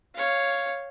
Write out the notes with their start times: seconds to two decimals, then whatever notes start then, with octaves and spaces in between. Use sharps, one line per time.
0.14 C#5 F5